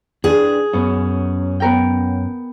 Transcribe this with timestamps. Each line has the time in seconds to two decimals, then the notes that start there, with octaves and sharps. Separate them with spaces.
0.24 D4 G#4 B4
0.73 F#2 B3 C#4
1.60 B3 A#4 G5